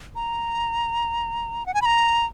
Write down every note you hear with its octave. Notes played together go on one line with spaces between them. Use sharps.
A#5
F#5
G#5
B5
A#5